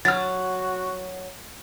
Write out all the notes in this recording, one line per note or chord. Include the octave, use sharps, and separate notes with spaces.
F#3 F#4 F6 A6